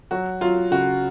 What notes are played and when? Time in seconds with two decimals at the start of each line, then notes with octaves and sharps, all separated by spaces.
0.11 F#3 F#4
0.41 F#3 F4
0.71 C#3 F#4